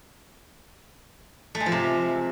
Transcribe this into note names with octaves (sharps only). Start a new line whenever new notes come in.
A3
G#3
F3
C3